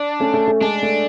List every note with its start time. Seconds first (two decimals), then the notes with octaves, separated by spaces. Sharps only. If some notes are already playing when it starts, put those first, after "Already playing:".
Already playing: D4
0.20 A3 C#4
0.34 A3
0.48 A3
0.61 G#3 D4
0.83 A3